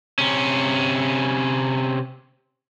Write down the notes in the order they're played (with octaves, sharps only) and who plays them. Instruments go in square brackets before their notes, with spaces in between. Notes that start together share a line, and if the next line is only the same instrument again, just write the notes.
[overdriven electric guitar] C3 C#4